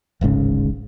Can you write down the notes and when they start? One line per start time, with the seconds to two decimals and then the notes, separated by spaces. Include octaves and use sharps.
0.21 D1 G#1 G#2 C#3